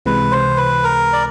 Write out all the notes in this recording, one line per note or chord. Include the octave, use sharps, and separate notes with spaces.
C#2 C3 E3 G#3 B4
C5
B4
A#4
D5